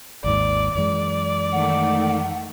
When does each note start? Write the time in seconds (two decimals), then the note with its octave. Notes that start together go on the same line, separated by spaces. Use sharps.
0.24 G#1 D#2 G#2 D5
0.75 F#2 E3 G#3 D5
1.52 D#3 A3 F#5